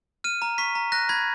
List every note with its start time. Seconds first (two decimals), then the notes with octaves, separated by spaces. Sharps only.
0.24 F6 D#7
0.42 A#5
0.58 C#6 B6
0.75 A#5
0.92 F#6 A#6
1.09 B5 G#6